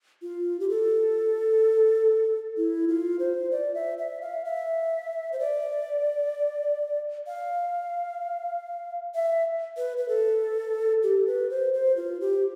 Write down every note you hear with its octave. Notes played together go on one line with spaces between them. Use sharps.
F4
G4
A4
E4
F4
C5
D5
E5
E5
F5
E5
C5
D5
F5
E5
B4
B4
A4
G4
B4
C5
C5
F4
G4